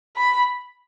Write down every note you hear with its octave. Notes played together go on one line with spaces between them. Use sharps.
B5